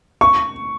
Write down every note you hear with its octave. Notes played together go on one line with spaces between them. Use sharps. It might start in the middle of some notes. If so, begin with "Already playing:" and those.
C#6